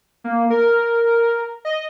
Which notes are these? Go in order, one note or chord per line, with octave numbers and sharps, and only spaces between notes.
A#3
A#4
D#5